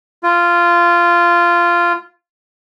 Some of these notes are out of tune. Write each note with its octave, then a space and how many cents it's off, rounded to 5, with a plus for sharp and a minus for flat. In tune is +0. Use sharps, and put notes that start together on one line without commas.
F4 -15